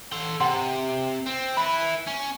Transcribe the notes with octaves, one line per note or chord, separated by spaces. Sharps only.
A4 C6
C3 F#5 C6
C4
E4 B4 B5
C#4